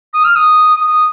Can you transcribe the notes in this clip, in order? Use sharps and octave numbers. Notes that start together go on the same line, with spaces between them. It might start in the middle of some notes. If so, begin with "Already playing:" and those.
D#6
F6
D#6
D#6